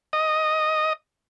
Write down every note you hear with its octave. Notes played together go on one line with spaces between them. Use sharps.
D#5